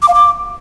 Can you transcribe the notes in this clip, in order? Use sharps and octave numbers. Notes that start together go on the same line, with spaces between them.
D6
F5
D6